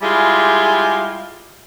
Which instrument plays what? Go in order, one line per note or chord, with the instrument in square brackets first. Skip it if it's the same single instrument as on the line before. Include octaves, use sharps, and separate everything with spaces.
[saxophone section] G3 G#3 E4 F4 G4 G#4